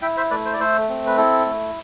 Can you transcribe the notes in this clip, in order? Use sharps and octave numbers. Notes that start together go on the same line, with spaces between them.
E4 E5 G5
C5 E5
A3 B4 D5
C5
D5
A3 A4 C5
C4
B4
E4 A4
A3